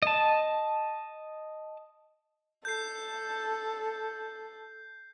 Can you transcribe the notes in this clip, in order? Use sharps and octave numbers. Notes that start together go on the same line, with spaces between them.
D#5 A5
A4 G6 C7